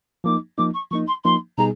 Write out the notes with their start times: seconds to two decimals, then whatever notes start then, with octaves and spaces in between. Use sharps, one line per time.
0.24 F3 A#3 D#4 D6
0.58 F3 A#3 D#4 D6
0.74 C#6
0.91 F3 A#3 D#4 C#6
1.07 C6
1.24 F3 A#3 D#4 C6
1.58 B2 G3 B3 D#4 G#4 A#5